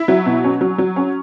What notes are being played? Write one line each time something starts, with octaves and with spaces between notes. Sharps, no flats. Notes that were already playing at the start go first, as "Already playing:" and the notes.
Already playing: E4
F#3
B2
C#4
F#3
F#3
C#4